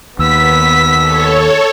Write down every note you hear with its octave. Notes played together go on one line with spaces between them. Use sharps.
D#2 B3 E6 B6
A4 C#5